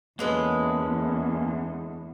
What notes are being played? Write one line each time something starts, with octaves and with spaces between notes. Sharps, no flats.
E2 D3 G#3 A#3 C#4 B4